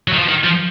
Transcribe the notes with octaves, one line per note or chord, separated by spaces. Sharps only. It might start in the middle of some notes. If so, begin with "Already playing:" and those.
F#3
D#3
F3
D#3
F3